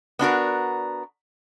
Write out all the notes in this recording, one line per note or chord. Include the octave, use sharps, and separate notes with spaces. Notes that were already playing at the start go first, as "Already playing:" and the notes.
B3 D4 F#4 A#4